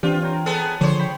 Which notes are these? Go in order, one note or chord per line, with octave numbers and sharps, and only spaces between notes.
E3 C4 D4 F4 G4
C#5 G5 A#5
B3 G#4 A4
D3 F3 C5 C#5
G5 B5